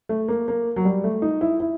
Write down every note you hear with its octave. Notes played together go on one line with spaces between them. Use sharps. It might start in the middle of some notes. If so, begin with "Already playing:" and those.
A3
A#3
A#3
F#3
G3
A3
D#4
E4
E4